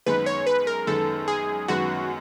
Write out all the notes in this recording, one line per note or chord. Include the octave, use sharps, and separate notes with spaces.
F#2 D#3 G#3 B3 B4
C#5
B4
A#4
F#2 D#3 G#3 B3 A4
G#4
F#2 D#3 G#3 B3 F#4